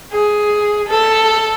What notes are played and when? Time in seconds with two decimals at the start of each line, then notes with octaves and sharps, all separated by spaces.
0.13 G#4
0.89 A4